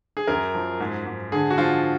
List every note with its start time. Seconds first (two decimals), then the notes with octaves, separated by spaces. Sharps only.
0.17 G#4
0.27 F#2 A#4
0.55 F3
0.80 G#2
1.06 G#2
1.32 D3 G#4
1.50 F#4
1.58 F3 F4